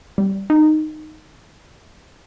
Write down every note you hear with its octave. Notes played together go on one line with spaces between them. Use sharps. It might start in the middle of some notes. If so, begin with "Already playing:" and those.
G3
D#4